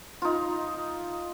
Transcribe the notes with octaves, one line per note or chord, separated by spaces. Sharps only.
D#4 F4